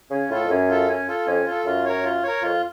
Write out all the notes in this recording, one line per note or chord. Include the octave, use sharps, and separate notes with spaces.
C#3 C#4
A2 F4 A4
F2
F#2 C#4
F4 A4
C#4
F4 A4
F2 C#4
F4 A4
F#2 F4
A#4 C#5
F4
A#4 C#5
F2 F4